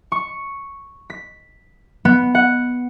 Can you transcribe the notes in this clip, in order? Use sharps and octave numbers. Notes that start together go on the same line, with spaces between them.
C#6
B6
B3
F#5